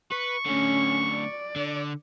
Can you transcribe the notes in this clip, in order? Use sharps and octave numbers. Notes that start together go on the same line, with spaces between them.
B4 C#6
A2 D3 C#4
D5
D3